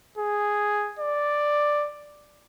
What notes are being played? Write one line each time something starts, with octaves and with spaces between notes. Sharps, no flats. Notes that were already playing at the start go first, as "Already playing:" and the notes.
G#4
D5